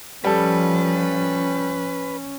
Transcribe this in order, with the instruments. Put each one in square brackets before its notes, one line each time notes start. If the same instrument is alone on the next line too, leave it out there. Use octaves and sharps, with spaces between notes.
[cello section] F3 [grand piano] G3 A4 [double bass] C#4 [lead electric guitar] B4